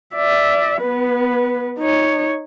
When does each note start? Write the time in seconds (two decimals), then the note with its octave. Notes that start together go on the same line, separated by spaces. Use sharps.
0.15 D5 E5
0.82 B3 B4
1.79 D#4 C#5